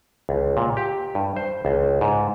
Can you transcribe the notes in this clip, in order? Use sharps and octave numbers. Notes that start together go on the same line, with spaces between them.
C#2
A#2
G4
G2
C5
C#2
G#2